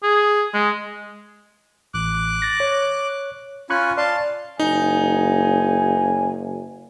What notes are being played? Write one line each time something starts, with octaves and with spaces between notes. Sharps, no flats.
G#4
G#3
A1 D6 F#6
A6 A#6
C#5
C#4 F4 G#5 B5 C#6 F#6
D5 F5 A5 C6
F#1 D#4 G#5